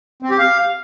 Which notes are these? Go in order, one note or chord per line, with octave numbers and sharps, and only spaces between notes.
C4
G4
F5